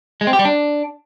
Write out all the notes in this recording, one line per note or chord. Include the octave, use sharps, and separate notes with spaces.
G#3
C4
G4
G3
D4